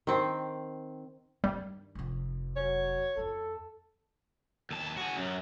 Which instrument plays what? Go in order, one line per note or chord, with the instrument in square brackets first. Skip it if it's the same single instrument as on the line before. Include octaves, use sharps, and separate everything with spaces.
[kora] D#3 C4
[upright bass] G2 D#3 [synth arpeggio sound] G3
[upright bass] F1 F2
[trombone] F#3 [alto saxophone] C#5
[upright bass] F2 F4 [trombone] A4
[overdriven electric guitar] D#2 A5
F#4 G#4
F#2 F#3